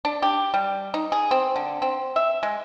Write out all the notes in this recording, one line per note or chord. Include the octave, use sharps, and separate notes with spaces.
D4
G4
G3
D#4
G#4
C4
D3
C4
E5
G#3